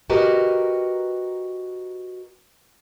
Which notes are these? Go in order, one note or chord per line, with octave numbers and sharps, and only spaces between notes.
F#4 G4 A#4 B4 D#5